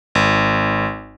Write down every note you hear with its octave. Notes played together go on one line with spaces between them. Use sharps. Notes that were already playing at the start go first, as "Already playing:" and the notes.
G#1